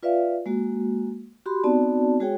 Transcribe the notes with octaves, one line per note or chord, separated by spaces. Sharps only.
F4 B4 D5 E5 F5
G#3 A#3 F#4
F#4 G4 B5 C6
B3 C4 D#4 F#4 D5 A5
G#3 F#4 G#4 C#5 G5